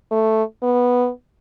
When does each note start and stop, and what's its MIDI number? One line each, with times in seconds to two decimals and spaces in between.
0.11 0.43 57
0.63 1.09 59